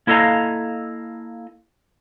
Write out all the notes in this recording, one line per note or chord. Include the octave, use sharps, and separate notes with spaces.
A#3 E4 A4 D#5 F5 A#5